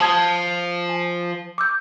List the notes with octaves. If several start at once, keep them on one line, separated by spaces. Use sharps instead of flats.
F3 A5 D#6 G#6
G#5
D6 E6 G6